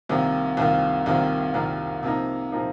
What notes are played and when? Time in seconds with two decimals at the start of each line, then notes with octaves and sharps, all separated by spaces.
0.09 C2 C3 D#3 A#3 F4
0.57 C2 C3 D#3 A#3 F4
1.06 C2 C3 D#3 A#3 F4
1.54 C2 C3 D#3 A#3 F4
2.03 C3 F3 A#3 D#4
2.52 C3 F3 A#3 D#4